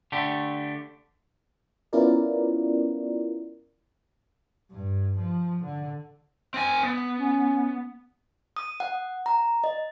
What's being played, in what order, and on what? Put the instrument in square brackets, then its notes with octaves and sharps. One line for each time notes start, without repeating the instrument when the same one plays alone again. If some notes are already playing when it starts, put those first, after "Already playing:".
[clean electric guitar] D3 A3 G4
[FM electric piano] B3 C#4 E4 F4 A#4 D5
[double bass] G2
F3
D3
[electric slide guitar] C4 G#5
B3
[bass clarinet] C#4
[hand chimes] D#6
F#5
A#5
D#5